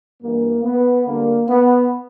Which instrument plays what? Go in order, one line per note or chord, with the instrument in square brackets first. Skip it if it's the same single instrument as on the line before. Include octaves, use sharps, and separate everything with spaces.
[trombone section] G2 E3 G3 A#3
B3
D2 D3 G3 A#3
B3